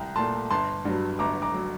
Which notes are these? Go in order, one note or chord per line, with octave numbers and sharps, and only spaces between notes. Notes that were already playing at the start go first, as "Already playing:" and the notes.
Already playing: C2 G5 A#5
A#2 A3 A5 C6
G1 A5 C6
G2 F#3
G1 A#5 D6
A#5 D6
F#3